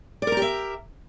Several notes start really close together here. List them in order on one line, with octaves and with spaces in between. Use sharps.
D5 A#4 A#5 G4 E5